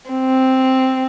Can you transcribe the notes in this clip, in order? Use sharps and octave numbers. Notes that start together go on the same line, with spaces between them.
C4